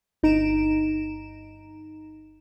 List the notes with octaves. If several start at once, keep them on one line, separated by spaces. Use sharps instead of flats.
G1 D#4 A#5 D7 E7